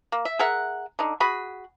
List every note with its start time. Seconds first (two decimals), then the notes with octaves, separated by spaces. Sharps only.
0.12 A#3
0.25 E5
0.39 G#4 A#4 E5 F#5
0.99 D3 D#4
1.20 F#4 G#4 B5